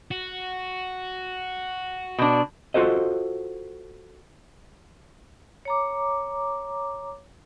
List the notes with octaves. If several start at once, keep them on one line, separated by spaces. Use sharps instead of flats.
F#4
B2 D4
F4 F#4 A4 C5 D#5
C#5 A#5 D6